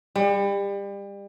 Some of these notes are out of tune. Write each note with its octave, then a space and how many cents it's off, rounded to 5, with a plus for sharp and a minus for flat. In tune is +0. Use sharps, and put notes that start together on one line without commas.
G3 +30